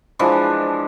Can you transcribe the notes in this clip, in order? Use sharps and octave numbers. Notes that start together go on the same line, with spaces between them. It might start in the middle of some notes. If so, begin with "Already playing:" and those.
E3 F3 G#3 D4